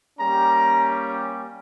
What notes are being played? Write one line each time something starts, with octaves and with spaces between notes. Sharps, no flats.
G3 A#3 C#4 G4 A#5